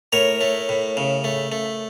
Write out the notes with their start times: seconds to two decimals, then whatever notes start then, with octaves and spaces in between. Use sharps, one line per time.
0.13 A2 A#4 C#5
0.41 A3
0.69 A2
0.97 C#3
1.24 A3
1.52 A3